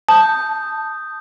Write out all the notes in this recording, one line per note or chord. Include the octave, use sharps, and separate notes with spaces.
A5 D#6 G6